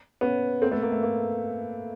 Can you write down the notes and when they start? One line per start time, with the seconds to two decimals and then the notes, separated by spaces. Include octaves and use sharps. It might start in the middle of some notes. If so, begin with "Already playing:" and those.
0.21 B3 C#4
0.62 A#3 C4
0.71 A3 B3
0.82 A#3
0.92 A3
1.03 A#3